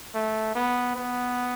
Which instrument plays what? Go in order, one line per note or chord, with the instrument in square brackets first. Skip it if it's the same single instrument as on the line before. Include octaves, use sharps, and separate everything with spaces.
[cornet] A3
B3
B3